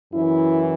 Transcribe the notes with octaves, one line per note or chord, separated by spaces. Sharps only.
F#2 E3 E4